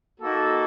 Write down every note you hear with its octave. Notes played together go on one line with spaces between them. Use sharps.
A#3 D#4 F#4 A4